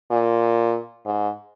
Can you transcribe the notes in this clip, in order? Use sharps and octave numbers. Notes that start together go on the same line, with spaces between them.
A#2
G#2